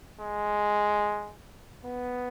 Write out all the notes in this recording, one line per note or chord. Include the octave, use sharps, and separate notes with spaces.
G#3
B3